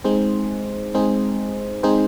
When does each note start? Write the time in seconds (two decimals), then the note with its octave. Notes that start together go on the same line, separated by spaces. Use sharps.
0.04 G#3 C4 D#4 G#4 C5
0.94 G#3 C4 D#4 G#4 C5
1.83 G#3 C4 D#4 G#4 C5